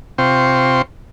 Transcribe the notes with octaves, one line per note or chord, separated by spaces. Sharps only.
C3 C4 F4 G5 C6 C#6